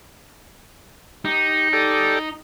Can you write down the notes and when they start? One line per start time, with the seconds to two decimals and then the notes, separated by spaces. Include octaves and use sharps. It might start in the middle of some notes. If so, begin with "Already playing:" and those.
1.25 D#4 G4
1.73 G4 A4 D5